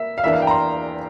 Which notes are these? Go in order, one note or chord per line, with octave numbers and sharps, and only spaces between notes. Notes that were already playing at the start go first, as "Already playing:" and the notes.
Already playing: A#3 E5
F5
E2 E3 A#3 D4 E5
F5
G5
A#5
C6